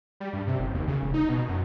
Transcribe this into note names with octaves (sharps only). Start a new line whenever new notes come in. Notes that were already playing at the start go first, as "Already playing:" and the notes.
G3
G2
C3
F#1
D#2
C#3
E1
D#4
B2
F#2